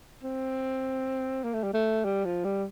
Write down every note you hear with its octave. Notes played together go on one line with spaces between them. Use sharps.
C4
A#3
A3
G3
A3
G3
F3
G3